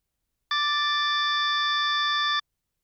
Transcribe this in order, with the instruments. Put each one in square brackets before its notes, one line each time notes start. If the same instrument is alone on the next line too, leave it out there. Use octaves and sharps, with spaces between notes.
[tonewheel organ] D6 A6